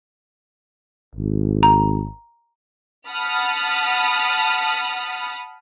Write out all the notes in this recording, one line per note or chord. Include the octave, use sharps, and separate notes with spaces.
G#1
A#5
F#5 A5 B5 D#6 F6